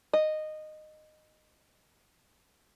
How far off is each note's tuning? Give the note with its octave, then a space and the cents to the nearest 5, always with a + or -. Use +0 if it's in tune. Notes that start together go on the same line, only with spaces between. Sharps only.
D#5 -15